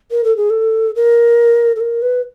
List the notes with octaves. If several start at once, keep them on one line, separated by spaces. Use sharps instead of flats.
A#4
A4
G#4
A4
A#4
A4
A#4
B4